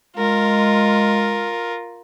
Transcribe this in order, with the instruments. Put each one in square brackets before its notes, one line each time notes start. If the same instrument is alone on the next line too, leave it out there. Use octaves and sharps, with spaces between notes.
[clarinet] G#3 [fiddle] F4 A#4